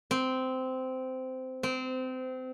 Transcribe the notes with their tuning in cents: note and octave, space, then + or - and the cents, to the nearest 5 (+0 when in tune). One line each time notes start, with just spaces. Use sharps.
C4 -15
C4 -25